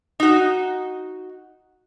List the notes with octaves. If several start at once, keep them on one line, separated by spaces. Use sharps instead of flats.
D#4 F#4